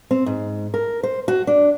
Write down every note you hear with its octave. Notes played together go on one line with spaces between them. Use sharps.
C4
G#2
A#4
C5
F#4
D4